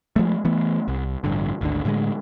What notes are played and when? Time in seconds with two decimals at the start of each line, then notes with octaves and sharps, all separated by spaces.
0.16 F3 G#3 A3
0.45 E3 A3 B3
0.88 C2
1.24 A1 G2 D3
1.61 G#1 D2 D3
1.85 A2 D3 G3 G#3